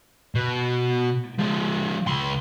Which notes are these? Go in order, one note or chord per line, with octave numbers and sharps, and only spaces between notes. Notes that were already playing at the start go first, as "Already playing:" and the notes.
B2
F3 G#3
C#2 C6